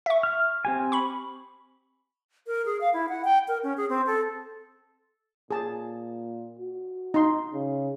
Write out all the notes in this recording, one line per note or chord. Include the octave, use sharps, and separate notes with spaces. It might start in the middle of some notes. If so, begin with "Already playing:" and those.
E5 C#6
F6
C4 G4 G#5
B5 C#6
A#4
G#4
F5
E4
F#5
G5
A#4
C#4
G#4
C4
A4
A#2 G#4 A5
F#4
D#4 C6
C#3